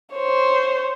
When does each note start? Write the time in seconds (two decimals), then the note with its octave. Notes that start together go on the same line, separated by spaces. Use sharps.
0.14 C5 C#5